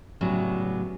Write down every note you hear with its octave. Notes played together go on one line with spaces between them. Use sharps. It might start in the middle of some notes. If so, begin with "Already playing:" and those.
A2 C#3 F#3 G3 B3